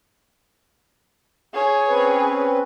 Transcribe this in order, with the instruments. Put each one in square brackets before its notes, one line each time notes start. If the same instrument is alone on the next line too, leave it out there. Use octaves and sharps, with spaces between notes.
[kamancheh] G#4 C#5
[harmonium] C4 C#4 B4